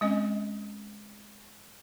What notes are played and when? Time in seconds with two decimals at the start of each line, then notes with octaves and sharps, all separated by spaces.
0.01 G#3 C4 C#4 D#5